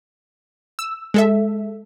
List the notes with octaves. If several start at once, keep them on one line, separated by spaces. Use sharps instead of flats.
E6
G#3 A4 E5